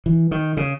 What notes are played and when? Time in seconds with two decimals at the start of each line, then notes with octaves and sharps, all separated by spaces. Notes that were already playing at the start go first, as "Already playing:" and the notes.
0.06 E3
0.31 D#3
0.57 C#3